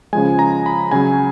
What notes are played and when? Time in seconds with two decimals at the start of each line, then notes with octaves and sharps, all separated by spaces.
0.13 C#3 F3 G#3 G#5
0.39 A#5
0.66 B5
0.91 C#3 F#3 G#5